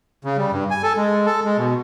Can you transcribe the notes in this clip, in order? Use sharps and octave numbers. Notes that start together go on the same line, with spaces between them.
C#3
G3
G2
G#5
A4
G#3
A4
G#3
B2